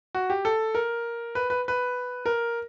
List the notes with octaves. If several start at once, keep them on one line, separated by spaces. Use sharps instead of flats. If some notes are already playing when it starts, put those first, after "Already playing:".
F#4
G4
A4
A#4
B4
B4
B4
A#4